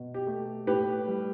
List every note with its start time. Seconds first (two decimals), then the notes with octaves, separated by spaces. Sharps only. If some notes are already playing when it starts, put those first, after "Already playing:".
Already playing: B2
0.14 G4
0.27 A3
0.67 A2 G4 B4
1.07 G3